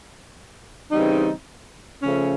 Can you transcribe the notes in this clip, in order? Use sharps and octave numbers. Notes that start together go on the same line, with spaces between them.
C#3 E3 G3 C4 D#4
C#3 F3 A3 C#4